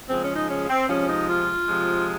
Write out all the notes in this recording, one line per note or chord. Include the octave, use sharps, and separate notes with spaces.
C#3 F3 G#3 C4
C#4
D#4
C#4
C4
C3 F3 G#3 C#4
D#4
F4
C3 F3 G#3